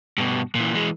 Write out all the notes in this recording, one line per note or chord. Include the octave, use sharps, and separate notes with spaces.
G2 B2
A#2 E3
E3 G#3